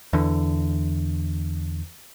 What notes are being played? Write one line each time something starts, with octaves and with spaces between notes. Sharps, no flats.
E2 D3